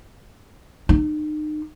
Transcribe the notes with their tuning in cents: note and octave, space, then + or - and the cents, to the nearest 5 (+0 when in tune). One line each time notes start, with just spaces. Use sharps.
D#4 -35